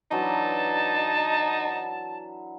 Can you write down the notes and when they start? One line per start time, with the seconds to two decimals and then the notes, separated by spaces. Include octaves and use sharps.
0.11 E3 F#3 D4 D#4 A5